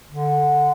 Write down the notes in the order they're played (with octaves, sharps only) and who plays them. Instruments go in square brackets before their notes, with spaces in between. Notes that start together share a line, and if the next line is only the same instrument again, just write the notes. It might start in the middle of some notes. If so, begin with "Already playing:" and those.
[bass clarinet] D3